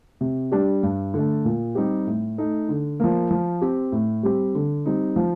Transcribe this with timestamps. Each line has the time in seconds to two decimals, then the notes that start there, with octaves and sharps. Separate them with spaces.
0.21 C3
0.52 G3 D4 G4
0.83 G2
1.14 D3 A3
1.45 A#2
1.75 G3 C4 D#4 G4
2.07 A2
2.38 A3 D#4
2.69 D3
3.00 F3 A#3
3.31 F3
3.62 C4 G4
3.92 A2
4.23 G3 C4 G4
4.55 D3
4.86 G3 C4 D#4
5.16 F3